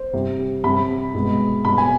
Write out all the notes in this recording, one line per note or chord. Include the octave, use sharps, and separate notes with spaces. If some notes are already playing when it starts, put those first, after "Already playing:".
Already playing: C5
C3 G3
C3 G3 B5
B2 G#3
B2 G3 B5
G#5